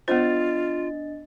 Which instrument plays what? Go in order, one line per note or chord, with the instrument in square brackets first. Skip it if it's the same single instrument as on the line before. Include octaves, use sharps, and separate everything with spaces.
[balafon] B3 C5 [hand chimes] D4 D#5 A6 [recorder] F4